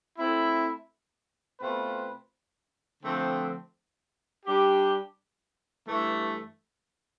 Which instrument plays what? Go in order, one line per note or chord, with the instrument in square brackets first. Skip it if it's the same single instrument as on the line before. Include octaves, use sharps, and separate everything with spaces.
[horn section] A3 C4 E4
B2 A3 C4 F4 B4
D3 F3 A3 C4
G3 D4 G4
G2 E3 A3